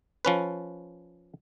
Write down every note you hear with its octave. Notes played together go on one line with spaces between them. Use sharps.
F3 C#4 B4